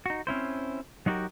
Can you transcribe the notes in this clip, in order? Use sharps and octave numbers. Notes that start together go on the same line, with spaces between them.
D#4 F#4
C4 C#4 E4 C5
F#3 D#4 F#4 G4 A#4